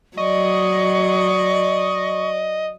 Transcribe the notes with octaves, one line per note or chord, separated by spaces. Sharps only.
F#3 D5 D#5 C#6